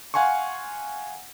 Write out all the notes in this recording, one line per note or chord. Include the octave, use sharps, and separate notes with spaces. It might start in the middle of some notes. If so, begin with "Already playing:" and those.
F5 F#5 G#5 C6 C#6